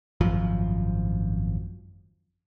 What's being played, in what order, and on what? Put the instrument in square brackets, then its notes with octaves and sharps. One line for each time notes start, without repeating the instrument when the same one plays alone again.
[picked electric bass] G#1 F#2 F3